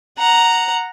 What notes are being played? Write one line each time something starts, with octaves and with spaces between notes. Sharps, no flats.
F#5 A#5